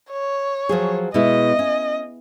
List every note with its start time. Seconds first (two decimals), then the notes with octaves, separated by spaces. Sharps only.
0.11 C#5
0.69 F3 F#3 G#4
1.14 B2 G#3 E4 D#5
1.59 C#4